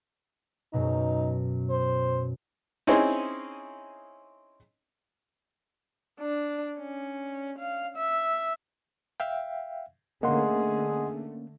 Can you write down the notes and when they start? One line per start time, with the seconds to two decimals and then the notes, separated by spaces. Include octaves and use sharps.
0.73 F#2 B2 D#4
1.70 C5
2.87 C4 C#4 D#4 E4 G#4 C5
6.20 D4
6.80 C#4
7.58 F5
7.97 E5
9.20 E5 F5 G5
10.23 D3 A3 A#3 C#4 G#4 D#5 F#5 C6